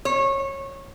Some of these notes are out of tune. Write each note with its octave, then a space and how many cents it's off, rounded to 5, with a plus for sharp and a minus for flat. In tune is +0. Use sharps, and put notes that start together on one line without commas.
C#5 -20